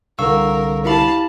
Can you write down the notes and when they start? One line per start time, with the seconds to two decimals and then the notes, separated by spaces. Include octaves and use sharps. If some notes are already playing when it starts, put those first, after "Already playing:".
0.19 C2 D3 A#4 F5 C#6 E6
0.85 E4 G4 F5 A5 B5